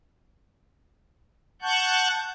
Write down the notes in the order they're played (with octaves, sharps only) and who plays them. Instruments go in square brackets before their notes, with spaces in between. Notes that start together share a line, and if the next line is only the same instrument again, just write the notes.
[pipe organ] F#5 A5 C#6 F#6 G6